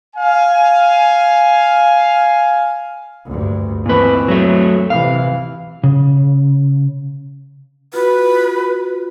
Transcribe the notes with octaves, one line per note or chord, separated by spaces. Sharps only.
F5 G#5
D2 G2
A#2 E3 C4 B4
F#3 A3
C3 E3 F5
C#3
F4 F#4 B4